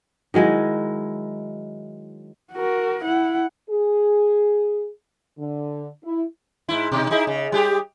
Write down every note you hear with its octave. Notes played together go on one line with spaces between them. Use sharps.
D#3 F#3 G#3 E4
F#4 A#4
E4 F#5
G#4
D3
E4
G#2 E4
B2 D#4
D#4 E4 G#4
C#3
G3 G4 G#4